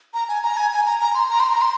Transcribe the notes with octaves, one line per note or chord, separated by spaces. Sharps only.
A#5
G#5
A#5
G#5
G#5
A#5
A#5
C6
A#5
C6
A#5
C6